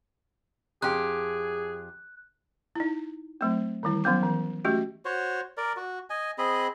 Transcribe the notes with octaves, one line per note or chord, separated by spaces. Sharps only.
F2 G4 G#4 F#6
D#4 E4
F#3 A3 C4
D#3 E3 G3 E4
F#3 B3 C#4 D6
E3
G#3 A3 C#4 F#4 G4
F#4 C5 C#5
A#4 D5
F#4
D#5 G#5
C4 G#4 D#5 B5